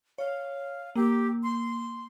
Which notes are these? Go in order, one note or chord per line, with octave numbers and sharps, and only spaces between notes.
C#5 F5
A#3 G4
C6